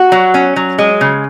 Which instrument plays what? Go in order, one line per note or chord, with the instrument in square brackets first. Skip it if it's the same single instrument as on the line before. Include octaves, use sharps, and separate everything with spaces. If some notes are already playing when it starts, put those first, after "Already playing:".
Already playing: [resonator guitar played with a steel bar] F#4
F#3
C#4
F#3
G#3
C#3